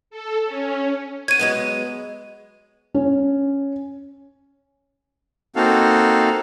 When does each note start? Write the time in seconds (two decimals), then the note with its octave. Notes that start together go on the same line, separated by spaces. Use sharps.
0.10 A4
0.46 C#4
1.28 C#5 F#5 G#6 D#7
1.39 F#3 G#3 B3
2.94 C#4
5.56 A#3 C4 D#4 F#4 A4 F5